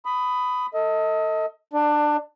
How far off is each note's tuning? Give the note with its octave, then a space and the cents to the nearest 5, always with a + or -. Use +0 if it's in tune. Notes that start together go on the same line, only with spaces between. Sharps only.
B5 +15 D#6 +0
A4 +30 D#5 +30
D4 +20 D5 +0